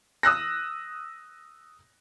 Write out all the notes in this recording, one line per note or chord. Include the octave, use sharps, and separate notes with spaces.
D#6 E6 F#6 A#6